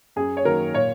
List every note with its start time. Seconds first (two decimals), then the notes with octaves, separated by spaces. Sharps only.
0.16 F#2 G#4
0.37 C#5
0.44 D#3 F#3 A#3 A#4
0.74 A#2 C#5